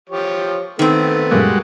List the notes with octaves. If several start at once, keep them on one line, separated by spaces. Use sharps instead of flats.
F3 G4 C#5
D#3 A3 B3 C4
F#2 A#2 G3 G#3 A#3 F#4